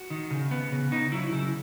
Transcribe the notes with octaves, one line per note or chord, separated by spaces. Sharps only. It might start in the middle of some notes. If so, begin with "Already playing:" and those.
Already playing: F#4
D#3
C#3
B3
C#3
C#3 D#4
F#3 E4
C#3 E4